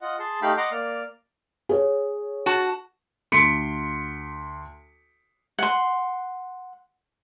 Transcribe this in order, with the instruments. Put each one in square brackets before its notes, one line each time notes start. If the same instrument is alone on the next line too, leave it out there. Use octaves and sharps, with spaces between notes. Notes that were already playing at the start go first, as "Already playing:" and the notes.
[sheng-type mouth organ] F4 D#5 F#5
G#4 A5 C6
A3 D#4 G4 F5 G5 B5
D#5 F#5 A#5 C6 D6
A#3 D5 F6
[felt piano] G#4 C#5
[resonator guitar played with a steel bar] F#4 A5
[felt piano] D2 C6 B6 C#7 D7
[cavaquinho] F#5 C6